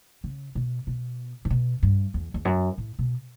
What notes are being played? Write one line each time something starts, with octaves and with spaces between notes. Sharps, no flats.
C#3
B2
B2
A2
B2
G2
E2
E2
F#2
A2
B2